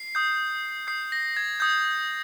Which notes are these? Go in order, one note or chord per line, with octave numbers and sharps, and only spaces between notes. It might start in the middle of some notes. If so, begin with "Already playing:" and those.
Already playing: C7
D#6 G6
D#6 G6 C7
A#6
G#6
D#6 G6